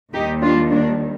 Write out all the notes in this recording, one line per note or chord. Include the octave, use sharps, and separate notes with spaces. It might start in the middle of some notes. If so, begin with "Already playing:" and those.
D#2 D#3 G3 D#4 G4
D4 F4
A#3 D4